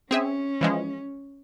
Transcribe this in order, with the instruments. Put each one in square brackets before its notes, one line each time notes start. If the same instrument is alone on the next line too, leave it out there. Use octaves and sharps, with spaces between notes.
[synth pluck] C4 G#4 E5 [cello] C#4
[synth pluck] E3 F3 G#3